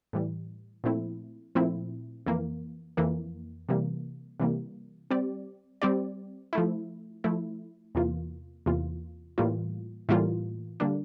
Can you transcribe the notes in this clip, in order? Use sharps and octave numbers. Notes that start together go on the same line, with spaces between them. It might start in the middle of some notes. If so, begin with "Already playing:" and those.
A2 E3 G3
A#2 F3 A3 C4 E4
A#2 F3 A3 C4 E4
F2 E3 A#3
F2 E3 A#3
C3 E3 G3 A#3
C3 E3 G3 A#3
G3 C4 G4 D5
G3 C4 G4 D5
F3 A3 E4
F3 A3 E4
E2 C3 E3 A#3 F4
E2 C3 E3 A#3 F4
A2 E3 G3 A#3 F4
A2 E3 G3 A#3 F4
D3 G3 A#3 D4